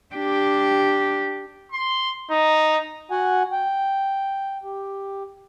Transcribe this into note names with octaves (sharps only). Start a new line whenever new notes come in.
D4 G4
C6
D#4
F#4 F#5 G#5
G5
G4